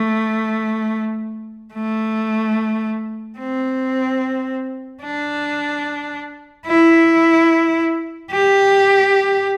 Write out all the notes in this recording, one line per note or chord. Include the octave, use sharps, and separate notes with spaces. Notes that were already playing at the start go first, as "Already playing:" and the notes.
Already playing: A3
A3
C4
D4
E4
G4